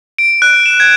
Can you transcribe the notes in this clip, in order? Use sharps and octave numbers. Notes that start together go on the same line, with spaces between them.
D7
F#6
E7
G#6